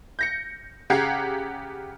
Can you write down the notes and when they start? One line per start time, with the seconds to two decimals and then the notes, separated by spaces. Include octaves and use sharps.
0.19 G6 A#6 C#7
0.90 C#3 G4 F#5 A#5 G#6 C7